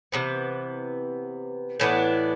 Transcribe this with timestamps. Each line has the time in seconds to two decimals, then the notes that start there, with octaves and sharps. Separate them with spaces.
0.12 C3 E3 B3
1.80 A2 E3 B3 D4